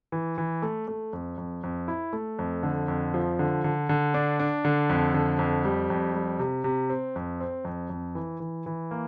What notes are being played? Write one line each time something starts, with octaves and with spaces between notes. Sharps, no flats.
E3
E3
A3
A3
F2
F2
F2
E4
A3
F2
D3
F2
F3
D3
D3
D3
D4
D4
D3
F2
D3
F2
G3
F2
G3
C3
C3
C4
F2
C4
F2
F2
E3
E3
E3
A#3